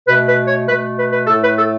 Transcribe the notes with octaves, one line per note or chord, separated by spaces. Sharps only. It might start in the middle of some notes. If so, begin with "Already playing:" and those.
B2 A3 B4
B4
C#5
B2 A3 B4
B4
B4
A2 A3 A4
B4
A4